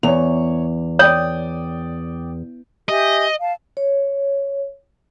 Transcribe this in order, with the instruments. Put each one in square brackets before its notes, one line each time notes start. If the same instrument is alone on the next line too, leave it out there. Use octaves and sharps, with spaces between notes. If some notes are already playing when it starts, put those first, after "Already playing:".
[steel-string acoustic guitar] E2 [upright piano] C#5 F7
[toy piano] C#5 [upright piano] D5 G5 D#6
[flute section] G4 E5 G#5 [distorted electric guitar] D#5
[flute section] F5 A5
[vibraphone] C#5